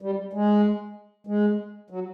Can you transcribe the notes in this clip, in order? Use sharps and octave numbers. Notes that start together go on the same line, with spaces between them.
G3
G#3
G#3
F#3